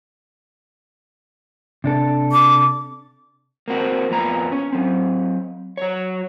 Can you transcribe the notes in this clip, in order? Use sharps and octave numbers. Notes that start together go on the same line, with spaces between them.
C3 D4 A4
D6
A#3 C4 F#4
F2 A#2 B3 A#5
C#4
F#3 C4
F#3 C#5